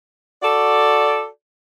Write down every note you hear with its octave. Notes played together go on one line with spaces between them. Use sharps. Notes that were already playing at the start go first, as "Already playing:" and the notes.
F#4 A4 D5